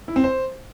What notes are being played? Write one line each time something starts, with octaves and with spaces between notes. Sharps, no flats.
E4
C4
C5